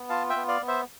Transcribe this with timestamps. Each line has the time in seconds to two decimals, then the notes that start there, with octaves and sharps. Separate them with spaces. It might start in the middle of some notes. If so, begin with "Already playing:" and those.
Already playing: B3
0.09 F4 F5 A5
0.29 E5 G5
0.36 B3
0.48 D5 F5
0.62 B3
0.68 C5 E5